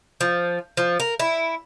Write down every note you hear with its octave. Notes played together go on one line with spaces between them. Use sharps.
F3
F3
A#4
E4